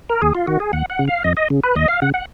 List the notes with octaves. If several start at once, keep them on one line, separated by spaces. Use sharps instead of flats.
A#4
D#2 G#4
F4
D#3 F#4
G#4
D#2 F#5
F#5
C#3
F5
F2 D#5
D#5
C#3
B4
D#2 D#5
F5
C#3 F#5
F#5